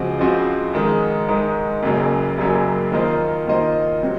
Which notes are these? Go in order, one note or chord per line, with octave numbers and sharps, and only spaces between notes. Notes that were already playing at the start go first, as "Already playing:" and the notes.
Already playing: C#2 C#3 F3 C4 F#4
C#2 C#3 F3 C4 F#4
G#2 D#3 G#3
G#2 D#3 G#3
F#1 F#2 C#3 F#3 A#3
F#1 F#2 C#3 F#3 A#3
D#3 A#3 F4 C5 D#5
D#3 A#3 F4 C5 D#5
C3 F#3 C4